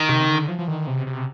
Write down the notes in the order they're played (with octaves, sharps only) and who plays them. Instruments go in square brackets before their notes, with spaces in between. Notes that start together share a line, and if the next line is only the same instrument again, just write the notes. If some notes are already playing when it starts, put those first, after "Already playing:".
Already playing: [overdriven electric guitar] D#3
[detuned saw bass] C3
D3
F3
F3
D#3
C3
C3